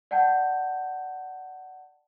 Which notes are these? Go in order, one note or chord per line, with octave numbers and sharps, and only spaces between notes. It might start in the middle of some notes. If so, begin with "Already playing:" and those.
D5 F#5 G5 A5 G6